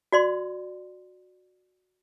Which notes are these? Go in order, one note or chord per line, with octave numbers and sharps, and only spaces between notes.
F#4 D5 C6